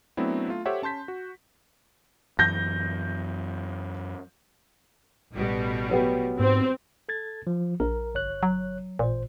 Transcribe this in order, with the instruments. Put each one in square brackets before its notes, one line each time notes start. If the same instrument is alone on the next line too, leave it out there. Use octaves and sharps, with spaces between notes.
[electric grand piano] F#3 A3 B3 C4 D4 E4
A3 F4
G4 A4 C5 C#5 E5 F#5
C#4 A5 C6 G6 B6
F#4
[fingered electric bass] F#2 E3 [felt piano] G6 A#6
[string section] A1 B2 G3
[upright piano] F#3 B3 G4
[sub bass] G#2 [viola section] C4
[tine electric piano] A4 G#6 A6
F3
[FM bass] A#1 [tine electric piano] A#4
[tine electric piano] G1 C#5 F#6
[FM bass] F#3
[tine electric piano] A1 C5 [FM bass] A#2